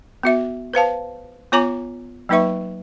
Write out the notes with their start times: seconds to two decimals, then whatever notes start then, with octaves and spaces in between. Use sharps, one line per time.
0.23 B3 F#4 E5
0.74 B4 C5 F5 A5
1.52 B3 F4 C#5 G#5 A#5 D6
2.29 F#3 A#3 D#4 B4 E5 C#6